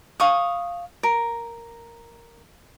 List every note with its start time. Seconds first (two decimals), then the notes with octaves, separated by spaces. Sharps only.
0.20 F5 C#6 D#6
1.03 A#4